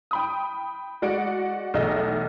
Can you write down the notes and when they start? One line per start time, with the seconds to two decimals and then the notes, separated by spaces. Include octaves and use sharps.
0.11 G5 B5 D#6
1.02 G#3 F#4 D5 F#5 D7
1.74 B1 E2 A3 G#4 D#5 E5